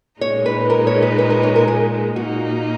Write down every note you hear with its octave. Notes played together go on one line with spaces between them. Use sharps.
A#2 G#3 D#4 C#5
B4
A#4
C#5
B4
B4
A#4
C#5
A#4
G#4
A#2 A#3 D#4 F#4